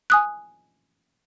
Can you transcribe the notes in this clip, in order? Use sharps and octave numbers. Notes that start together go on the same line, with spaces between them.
G#5 D#6 F#6